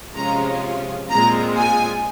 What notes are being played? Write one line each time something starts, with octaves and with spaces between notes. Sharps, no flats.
C3 F3 G#3 C#4 F4 A#5
A#2 G#3 C4 F4 A#5
G#5